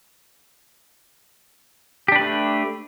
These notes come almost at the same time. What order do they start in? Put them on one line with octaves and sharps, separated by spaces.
G4 D4 B4 A3